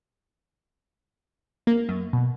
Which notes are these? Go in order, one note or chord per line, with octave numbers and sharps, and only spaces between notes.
A#3
F#2
B2